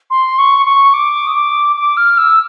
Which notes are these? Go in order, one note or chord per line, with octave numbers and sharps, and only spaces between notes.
C6
C#6
C#6
D6
D#6
D6
D6
F6
E6